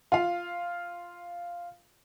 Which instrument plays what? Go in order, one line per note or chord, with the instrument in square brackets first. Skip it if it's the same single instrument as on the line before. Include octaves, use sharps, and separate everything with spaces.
[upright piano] F4 F5